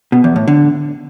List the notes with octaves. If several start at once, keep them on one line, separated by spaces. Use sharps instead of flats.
B2
E2
A2
D3